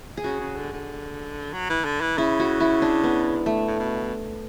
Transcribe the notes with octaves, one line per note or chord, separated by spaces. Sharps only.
G#4
C#3 F#4
C#3
D3
D3
F#3
E3
D3
E3
C#3 E4
F#4
E4
D4
B3
G#2
A2 A3
A2
B2